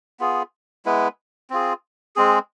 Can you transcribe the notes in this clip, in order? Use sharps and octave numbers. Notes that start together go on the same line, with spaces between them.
B3 F4 G#4
G#3 B3 E4 B4
C4 F4 G#4
G#3 C4 G#4